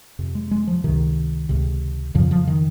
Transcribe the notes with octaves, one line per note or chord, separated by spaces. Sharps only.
F2 C3
G#3
G#3
F3
C#2 C3 D#3
C#2 C3
F2 C#3 F3
F3
D#3